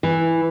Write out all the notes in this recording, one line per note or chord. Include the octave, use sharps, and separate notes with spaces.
E3